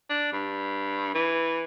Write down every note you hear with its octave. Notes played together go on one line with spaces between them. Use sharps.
D4
G2
E3